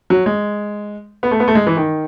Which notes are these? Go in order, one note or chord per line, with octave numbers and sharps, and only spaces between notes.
F#3
G#3
B3
A3
B3
A3
G#3
E3
D#3